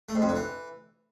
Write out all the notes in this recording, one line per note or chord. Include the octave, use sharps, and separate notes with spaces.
A3
G#2
F2
D3
E3